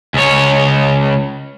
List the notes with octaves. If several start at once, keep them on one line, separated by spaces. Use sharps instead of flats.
C#2 C#5